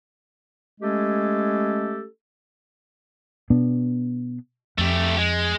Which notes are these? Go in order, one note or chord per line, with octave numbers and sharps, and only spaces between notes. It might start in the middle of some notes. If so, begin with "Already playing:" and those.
G#3 A3 C#4 G4 A4
B2 B3 D4
F2 A3 G4
G#3